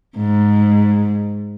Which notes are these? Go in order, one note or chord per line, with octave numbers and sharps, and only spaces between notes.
G#2